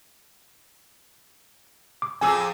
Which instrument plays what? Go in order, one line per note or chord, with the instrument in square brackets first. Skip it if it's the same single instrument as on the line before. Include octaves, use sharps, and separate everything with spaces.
[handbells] D6
[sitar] F2 G#4 [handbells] G#5 E6